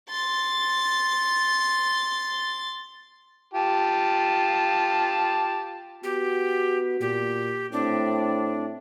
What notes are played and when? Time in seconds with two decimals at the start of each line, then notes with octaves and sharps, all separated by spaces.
0.10 C6 A6
3.54 F4 G4 A5
6.04 B3 F#4 G4
7.01 A#2 G4
7.72 A2 C4 D4